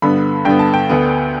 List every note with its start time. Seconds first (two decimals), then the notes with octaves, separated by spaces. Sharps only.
0.02 G2 D3 B3 B5
0.45 G2 D3 B3 G5
0.59 A5
0.74 G5
0.89 D2 D3 B3